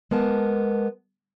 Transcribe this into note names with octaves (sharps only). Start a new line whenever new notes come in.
G#3 B3 A#4 A5